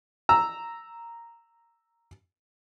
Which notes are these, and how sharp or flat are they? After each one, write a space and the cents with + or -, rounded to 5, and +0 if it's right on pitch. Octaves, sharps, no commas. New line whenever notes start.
A#5 -5 E6 +0